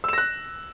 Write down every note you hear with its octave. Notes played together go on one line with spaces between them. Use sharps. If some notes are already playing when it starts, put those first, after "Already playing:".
E6 F#6 A#6 E7